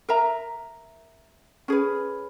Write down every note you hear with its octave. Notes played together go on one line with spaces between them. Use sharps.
A#4 E5 A#5
C#4 G#4 B4